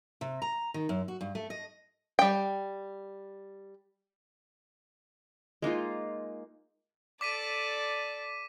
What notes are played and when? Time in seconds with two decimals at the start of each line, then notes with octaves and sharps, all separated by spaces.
0.21 C3
0.42 A#5
0.74 D#3
0.89 F#2
1.08 F#4
1.21 G2
1.35 A3
1.50 D#5
2.19 G3 G5
5.62 G#3 A#3 D#4 F4
7.21 A4 D5 D6 B6 D#7